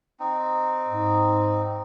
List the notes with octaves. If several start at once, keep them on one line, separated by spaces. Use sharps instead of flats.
C4 D#4
G#2